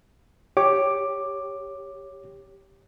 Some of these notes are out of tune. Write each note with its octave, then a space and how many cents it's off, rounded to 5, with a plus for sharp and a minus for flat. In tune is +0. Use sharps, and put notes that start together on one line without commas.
G4 +0 C#5 +0 D6 +10